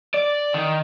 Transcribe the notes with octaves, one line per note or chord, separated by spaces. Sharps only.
D5
D#3